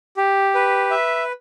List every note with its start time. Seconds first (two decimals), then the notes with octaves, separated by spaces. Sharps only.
0.17 G4
0.55 B4
0.91 E5